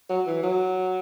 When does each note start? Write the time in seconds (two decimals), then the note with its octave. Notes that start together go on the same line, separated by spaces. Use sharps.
0.10 F#3
0.27 E3
0.43 F#3